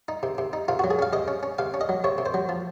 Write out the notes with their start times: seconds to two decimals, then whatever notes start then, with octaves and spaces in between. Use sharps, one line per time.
0.08 D#4
0.23 C3
0.38 C3
0.53 D#4
0.68 C3 F4
0.79 F#3 F#4
0.91 G#4
0.99 C#4 F5
1.13 C3 D#5
1.28 C#4
1.43 C#4
1.58 C3 F5
1.74 C#4
1.81 D#5
1.89 F#3
2.04 C3 C#5
2.18 C3
2.26 C5
2.34 F#3
2.49 F3